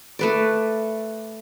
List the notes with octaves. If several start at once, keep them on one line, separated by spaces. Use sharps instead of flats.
A3 B4 D5